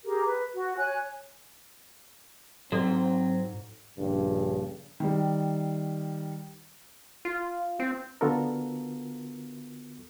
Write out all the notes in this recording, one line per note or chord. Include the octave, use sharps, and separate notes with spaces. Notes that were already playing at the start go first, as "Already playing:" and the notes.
G4 G#4 A#4
B4
F#4
C#5 G#5 F#6
G#2 F#3 C4 F#4 A4 D5
A#1 G2 C#3
D#3 G3
F4
C4
D3 B3 F4 F#4 A4 A#4